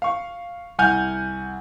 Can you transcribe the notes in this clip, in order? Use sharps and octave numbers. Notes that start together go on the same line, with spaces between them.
F5 C#6
C2 F#5 G#5 F6 G6